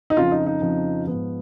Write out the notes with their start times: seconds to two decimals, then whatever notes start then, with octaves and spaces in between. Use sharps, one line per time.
0.10 D#4
0.17 F2 C#3 F3 F4
0.31 D#4
0.47 D#4
0.62 F2 C#3 F3
1.07 G#2 F3 B3